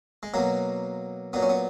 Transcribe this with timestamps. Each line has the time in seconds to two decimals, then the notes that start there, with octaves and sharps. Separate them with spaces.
0.23 G#3
0.34 B2 F#3 A#3
1.33 A#2 F#3 B3
1.42 C#4
1.49 B3